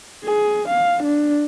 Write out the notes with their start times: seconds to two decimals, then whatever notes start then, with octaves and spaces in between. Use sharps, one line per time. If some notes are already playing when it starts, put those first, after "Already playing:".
0.25 G#4
0.69 F5
1.04 D4